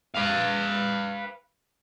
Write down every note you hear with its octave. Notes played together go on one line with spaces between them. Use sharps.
B4 F5